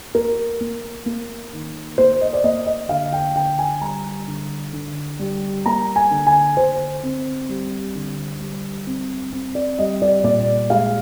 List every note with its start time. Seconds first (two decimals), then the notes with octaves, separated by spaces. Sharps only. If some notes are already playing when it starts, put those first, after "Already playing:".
0.14 A#3 A#4
0.61 A#3
1.06 A#3
1.53 D#3
1.98 A#3 C5
2.21 D#5
2.33 D5
2.44 A#3 D#5
2.66 D#5
2.89 D3 F5
3.13 G5
3.35 D3 G5
3.59 G#5
3.81 G3 A#5
4.27 D3
4.73 D3
5.19 G3
5.66 A#3 A#5
5.96 G#5
6.11 D3
6.27 G#5
6.57 D3 C5
7.03 C4
7.49 G3
7.95 D3
8.40 G3
8.87 C4
9.32 C4
9.55 D5
9.79 G3 D#5
10.02 D5
10.24 A#2 D5
10.70 G#3 F5